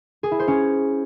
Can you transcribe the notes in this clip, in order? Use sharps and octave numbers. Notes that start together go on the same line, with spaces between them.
G#4
E4
C5
C#4